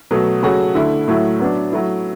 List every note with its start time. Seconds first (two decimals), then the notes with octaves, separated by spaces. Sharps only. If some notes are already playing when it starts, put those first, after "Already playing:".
0.11 B2 F#3 A3
0.42 C#3 F#3 A3 C#4 F#4
0.75 D3 A3 E4
1.08 A2 F#3 A3 E4
1.40 F#3 B3 D4
1.72 F#3 A3 E4